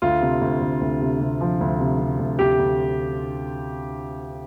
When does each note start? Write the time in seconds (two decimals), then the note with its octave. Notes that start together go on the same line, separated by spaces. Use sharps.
0.02 D2 F4
0.21 C3
0.41 D2
0.61 D2
0.81 D2
1.01 C3
1.20 C3
1.41 F3
1.60 D2
1.80 C3
1.99 C3
2.19 D2
2.39 D2 G4
2.59 D2